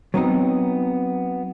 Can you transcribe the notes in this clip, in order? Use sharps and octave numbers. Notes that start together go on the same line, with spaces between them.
F#3 B3 C4 D#4